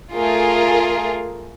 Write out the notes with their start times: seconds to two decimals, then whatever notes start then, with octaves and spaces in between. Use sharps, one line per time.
0.13 A3 F4 G#4 A#4